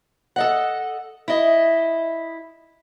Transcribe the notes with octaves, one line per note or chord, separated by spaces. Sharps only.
A4 D#5 F#5
E4 D#5